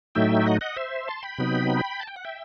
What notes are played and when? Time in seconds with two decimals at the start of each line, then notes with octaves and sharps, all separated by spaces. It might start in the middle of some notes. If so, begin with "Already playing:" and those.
0.15 A2 F#3 A3 D#4 E5 G5
0.46 D#5 F#5
0.61 D#5 F#5
0.76 C5 E5
1.08 A5 C6
1.23 G5 B5
1.38 C3 F#3 B3 D#4
2.00 A5
2.07 G5
2.16 F#5
2.25 E5 G5